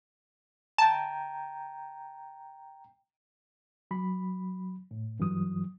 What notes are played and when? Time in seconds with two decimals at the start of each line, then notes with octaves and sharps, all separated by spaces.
0.78 G5 A5 A#5
3.91 F#3 B5
4.91 A2
5.19 G2 E3 F#3 D#6